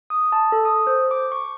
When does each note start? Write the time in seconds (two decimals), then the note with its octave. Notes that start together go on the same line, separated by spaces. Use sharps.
0.10 D#6
0.32 A5
0.52 A4
0.65 D#6
0.87 C5
1.11 D6
1.32 C#6